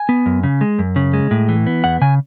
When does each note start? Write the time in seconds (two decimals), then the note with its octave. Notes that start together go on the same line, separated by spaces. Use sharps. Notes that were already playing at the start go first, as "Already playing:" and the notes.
Already playing: G#5
0.09 B3
0.26 F#2
0.43 C#3
0.61 G#3
0.79 F#2
0.96 C#3
1.13 G#3
1.31 A2
1.49 E3
1.67 B3
1.84 E2 F#5
2.01 C#3 G#5